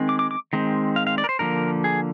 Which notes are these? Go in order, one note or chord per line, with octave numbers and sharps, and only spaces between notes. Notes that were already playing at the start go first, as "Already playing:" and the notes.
Already playing: D#3 G#3 C4
D6
D6
D6
D#3 G#3 C4
F5
F5
D5
A#4
C5
D3 F3 A#3 A#4
G#4